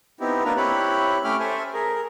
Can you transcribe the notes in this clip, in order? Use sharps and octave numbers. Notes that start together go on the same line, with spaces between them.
B3 C4 D#4 E4 G4
A#3 D4 F4 A#4 B4 A#5
C4 E4 G4 C#5 B5 F#6
A3 C#4 G5 B5 D6 F6
A4 C5 E5 G#5
G#4 A#4